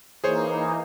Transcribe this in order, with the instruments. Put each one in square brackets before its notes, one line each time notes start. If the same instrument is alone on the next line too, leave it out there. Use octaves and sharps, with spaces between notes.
[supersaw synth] E3 A#3 D#4 [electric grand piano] G#4 C5 C#5